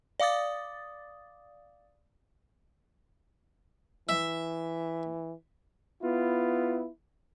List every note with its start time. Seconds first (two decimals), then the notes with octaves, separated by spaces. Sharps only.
0.20 D5 F5 D6 D#6 A6
4.09 E3 E5
6.02 B3 E4 F4